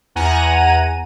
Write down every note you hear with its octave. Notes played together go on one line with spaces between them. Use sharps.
E2 F#5 G#5 A#5 D#7